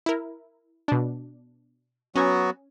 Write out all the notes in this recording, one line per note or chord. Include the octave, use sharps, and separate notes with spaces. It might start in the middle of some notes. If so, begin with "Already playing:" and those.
E4 A#4
B2 D4
F#3 B3 C#4 F#4 G#5